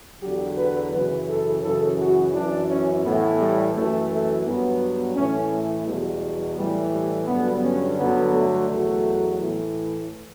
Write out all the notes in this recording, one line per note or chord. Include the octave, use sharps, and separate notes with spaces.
E2 D3 F#3 G4
B4
F#2 C#3 E3 B4
A4
F#2 C#3 E3 A4
F#4
F#2 E3 D4
C#4
A2 E3 B3
G3
F#2 E3 A3
A3
G2 F#3 B3
A2 E3 C#4
A3
E2 B2 F#3 G3
A2 E3 G3
G3
G2 D3 F#3 B3
C#4
G2 D3 F#3 B3
A3
E2 B2 F#3
A2 E3